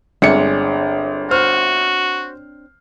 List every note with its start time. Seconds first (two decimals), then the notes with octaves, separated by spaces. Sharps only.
0.22 G1 G#3 C4 D4 C#5 C#7
1.31 F#4 C5 F6